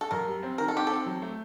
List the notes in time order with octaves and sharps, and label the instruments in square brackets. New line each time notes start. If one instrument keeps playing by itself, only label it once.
[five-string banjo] A4
[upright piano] F#2 [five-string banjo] A#4
[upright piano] G3
C4
[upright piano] D#3 [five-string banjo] A#4
[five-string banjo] A4
[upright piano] C4 [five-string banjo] G4
[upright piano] C4 [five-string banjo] A4
[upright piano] F#3
A3